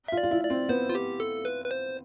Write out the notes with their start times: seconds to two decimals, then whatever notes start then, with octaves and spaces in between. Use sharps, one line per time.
0.08 F4 E5
0.17 D5
0.23 F4
0.31 E4
0.44 D5
0.50 C4
0.69 B3 C5
0.90 F4
0.95 G4
1.20 A4
1.45 B4
1.66 B4
1.71 C5